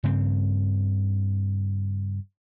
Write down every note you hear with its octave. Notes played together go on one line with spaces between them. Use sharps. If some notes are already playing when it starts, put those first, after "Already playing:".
G2 C#3 C4